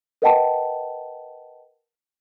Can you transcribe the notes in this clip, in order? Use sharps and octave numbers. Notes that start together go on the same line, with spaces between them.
A#4 B4 D#5 F#5 G5 A5